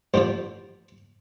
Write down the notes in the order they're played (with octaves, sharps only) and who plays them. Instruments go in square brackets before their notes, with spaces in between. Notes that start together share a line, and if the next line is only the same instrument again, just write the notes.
[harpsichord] A1 G2 D3 F3 C5